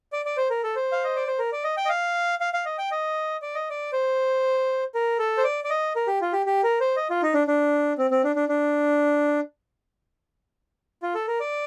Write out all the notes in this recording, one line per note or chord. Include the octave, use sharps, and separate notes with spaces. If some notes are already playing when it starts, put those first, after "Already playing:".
D5
D5
C5
A#4
A4
C5
F5
D#5
D5
C5
A#4
D5
D#5
G5
D#5
F5
F5
F5
D#5
G5
D#5
D5
D#5
D5
C5
A#4
A4
C5
D5
D5
D#5
A#4
G4
F4
G4
G4
A#4
C5
D#5
F4
D#4
D4
D4
C4
C4
D4
D4
D4
F4
A4
A#4
D5